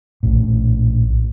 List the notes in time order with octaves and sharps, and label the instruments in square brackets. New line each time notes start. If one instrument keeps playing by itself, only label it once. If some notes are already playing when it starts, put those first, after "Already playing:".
[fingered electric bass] A#1 A2